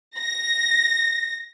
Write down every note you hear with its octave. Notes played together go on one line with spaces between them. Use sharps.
A#6